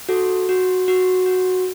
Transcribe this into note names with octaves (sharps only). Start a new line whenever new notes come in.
F#4 A4
F#4
F#4
F#4